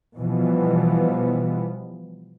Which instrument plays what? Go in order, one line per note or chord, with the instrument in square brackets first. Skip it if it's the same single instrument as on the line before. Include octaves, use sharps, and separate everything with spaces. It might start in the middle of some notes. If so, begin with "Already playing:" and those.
[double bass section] B2 E3 F3 G3 B3